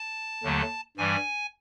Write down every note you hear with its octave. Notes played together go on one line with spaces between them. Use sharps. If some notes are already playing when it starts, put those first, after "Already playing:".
Already playing: A5
D#2 D3 F#3 A3
G2 E3 G3 G#5